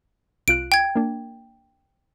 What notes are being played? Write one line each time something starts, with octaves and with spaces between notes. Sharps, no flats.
C2 F4 F#6 D7
G5 G#6
A#3 D4